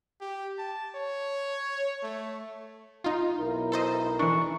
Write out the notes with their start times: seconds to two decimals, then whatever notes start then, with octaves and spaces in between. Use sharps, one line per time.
0.21 G4
0.58 A5
0.96 C#5
2.02 A3
3.04 D#4 F4
3.38 B1 E4 A#4
3.72 A4 C5 D#5
4.19 E3 D4 C#6